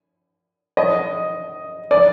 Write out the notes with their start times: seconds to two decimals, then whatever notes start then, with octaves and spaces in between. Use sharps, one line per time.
0.77 D#5
1.91 D5